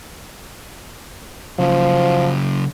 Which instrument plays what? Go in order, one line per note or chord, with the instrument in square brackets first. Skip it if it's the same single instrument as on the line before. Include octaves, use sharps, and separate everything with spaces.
[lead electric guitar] C#3 F#3 [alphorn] F3